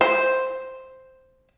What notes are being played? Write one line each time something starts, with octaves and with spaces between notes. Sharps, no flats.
C5